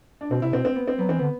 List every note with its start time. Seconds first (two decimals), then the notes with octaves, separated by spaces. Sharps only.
0.21 D4
0.31 B2 C4
0.42 C3 E4
0.53 B2 C4
0.65 C4
0.75 B3
0.88 C4
0.98 F#3 B3
1.09 E3 C4
1.19 D3 B3